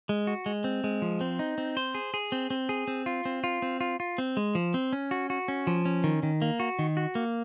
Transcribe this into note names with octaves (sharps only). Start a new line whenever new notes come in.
G#3
F#4
G#3
C4
G#3
F3
C4
D#4
C4
C5
G#4
G#4
C4
C4
G#4
C4
F4
C4
F4
C4
F4
F4
C4
G#3
F3
C4
C#4
F#4
F#4
C#4
F3
C#4
D#3
D#3
A#3
F#4
D#3
F#4
A#3